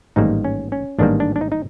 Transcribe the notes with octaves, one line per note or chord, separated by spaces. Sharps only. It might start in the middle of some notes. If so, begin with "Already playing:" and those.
A1 G#2 D#3 G3 A#3 D#4
C#4
C#4
A1 G#2 D#3 G3 A#3 D4
D4
D4
D#4
D#4